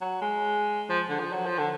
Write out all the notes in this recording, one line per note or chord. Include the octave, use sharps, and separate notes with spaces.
F#3
G#3
F3
D3
F3
F#3
F3
D3